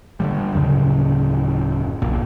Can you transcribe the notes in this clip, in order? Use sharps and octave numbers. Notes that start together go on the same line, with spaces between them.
D3 E3 G3
D1 F#2 C#3
B1 A#2